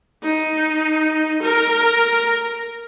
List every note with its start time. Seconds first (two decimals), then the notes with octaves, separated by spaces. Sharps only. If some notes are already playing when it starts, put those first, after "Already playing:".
0.23 D#4
1.42 A#4